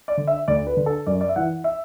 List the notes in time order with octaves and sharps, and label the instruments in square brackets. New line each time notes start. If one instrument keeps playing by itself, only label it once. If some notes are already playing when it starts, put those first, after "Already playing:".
[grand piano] D5
D3
E5
D2 D5
B4
D3
A4
F#2 D5
D5
E5
E3 F#5
E5